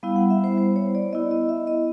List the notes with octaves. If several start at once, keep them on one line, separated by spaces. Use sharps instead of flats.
G3 B3 E4 F5
F#5
E5
C5
C5
C#5
D5
B3 E4 D#5
D#5
E5
D#5